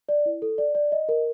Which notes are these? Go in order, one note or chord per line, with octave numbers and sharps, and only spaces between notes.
D5
E4
A4
D5
D5
D#5
A#4